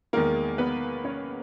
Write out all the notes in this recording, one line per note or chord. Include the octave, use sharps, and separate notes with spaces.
E2 D#3 G#3 A#3 A#4
B3 B4
C#4 C#5